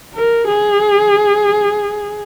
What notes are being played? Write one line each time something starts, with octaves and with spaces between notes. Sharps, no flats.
A#4
G#4